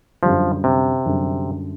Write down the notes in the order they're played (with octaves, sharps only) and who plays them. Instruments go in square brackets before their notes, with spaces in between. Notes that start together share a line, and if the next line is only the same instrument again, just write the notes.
[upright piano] F#2 D3 G3 [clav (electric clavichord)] F3
[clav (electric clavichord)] C3
[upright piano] F#2 D3 G3